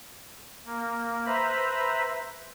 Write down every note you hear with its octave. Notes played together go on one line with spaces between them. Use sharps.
A#3
B4 C5 E5 A#5 B5